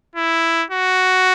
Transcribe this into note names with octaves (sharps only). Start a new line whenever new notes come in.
E4
F#4